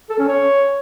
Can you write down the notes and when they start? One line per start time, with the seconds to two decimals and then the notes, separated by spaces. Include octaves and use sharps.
0.10 A4
0.19 C#4
0.28 C#5